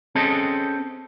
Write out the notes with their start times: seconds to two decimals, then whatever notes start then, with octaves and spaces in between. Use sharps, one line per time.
0.15 C4 C#4 G#4 A4 C5 D#5